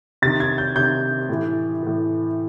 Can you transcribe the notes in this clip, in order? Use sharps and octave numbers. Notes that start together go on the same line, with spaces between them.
C3 D#3 A6
G#6
G6
C3 D#3 G6
A2 E3
A2 E3